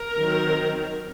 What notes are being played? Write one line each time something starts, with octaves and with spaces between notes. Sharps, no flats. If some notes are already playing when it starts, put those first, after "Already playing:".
Already playing: A#4
D#3 F#3 C4